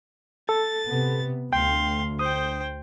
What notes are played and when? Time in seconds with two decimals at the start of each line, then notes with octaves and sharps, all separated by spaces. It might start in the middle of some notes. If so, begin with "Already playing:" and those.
0.49 A4 A6
0.89 C3 B3
1.53 D2 F5 G5 C6
2.19 C5 G5 D#6